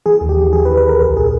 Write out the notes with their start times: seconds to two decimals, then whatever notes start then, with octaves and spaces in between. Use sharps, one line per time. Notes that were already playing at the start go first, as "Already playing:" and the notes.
0.06 E3 G#4
0.21 D#2
0.29 G4
0.37 E3
0.53 E3 G#4
0.65 B4
0.69 D#2
0.77 B4
0.84 D#2 A#4
1.01 C2 A#4
1.16 A#2 G#4